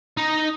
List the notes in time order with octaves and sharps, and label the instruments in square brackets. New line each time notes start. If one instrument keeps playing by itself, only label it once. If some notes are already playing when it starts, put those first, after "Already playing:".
[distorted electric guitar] D#4